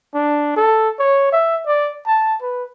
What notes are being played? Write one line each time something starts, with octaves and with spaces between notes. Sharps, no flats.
D4
A4
C#5
E5
D5
A5
B4